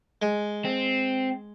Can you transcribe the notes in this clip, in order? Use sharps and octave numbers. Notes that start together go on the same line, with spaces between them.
G#3
C4